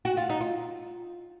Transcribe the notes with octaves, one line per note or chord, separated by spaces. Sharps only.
F#4
F4
D#4
F4